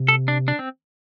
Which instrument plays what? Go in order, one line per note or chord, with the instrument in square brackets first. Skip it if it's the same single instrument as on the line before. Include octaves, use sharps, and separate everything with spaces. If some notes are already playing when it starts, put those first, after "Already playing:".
Already playing: [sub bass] C3
[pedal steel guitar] A4
D4
D4
C4